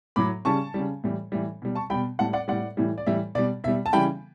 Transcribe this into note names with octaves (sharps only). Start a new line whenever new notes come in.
A2 F#3 B5 D6
C#3 G3 A5 C#6
C#3 G3
A2 E3 G3
A2 E3 G3
B2 G3
A5 C#6
B2 G3 G5 B5
A2 G3 F#5 A5
D5 F#5
A2 G3 D5 F#5
A2 E3 G3
D5
A2 E3 G3 E5
B2 G3 D5
B2 G3 E5
A5
C#3 E3 G3 G5 B5